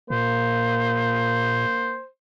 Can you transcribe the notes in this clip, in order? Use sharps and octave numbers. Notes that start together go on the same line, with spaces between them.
A#2 A#3 C5